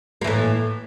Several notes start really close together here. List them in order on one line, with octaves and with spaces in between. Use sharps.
A#3 E3 A2